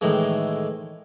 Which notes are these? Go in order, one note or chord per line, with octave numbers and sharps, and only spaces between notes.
A2 D#3 E3 G#3